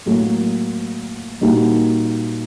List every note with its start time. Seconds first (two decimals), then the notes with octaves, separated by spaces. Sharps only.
0.06 A2 F#3 A#3
1.41 A#2 G3 A#3 D#4 F#4